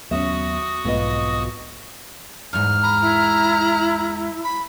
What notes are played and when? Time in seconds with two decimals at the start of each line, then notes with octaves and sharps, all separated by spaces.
0.11 D#2 F#3 B3 C#4 F#4 E5 D#6
0.85 B1 F2 G#2 B2 B3 D#5
2.53 E2 G#2 F6
2.83 A#5 B5
3.01 E4
4.44 B5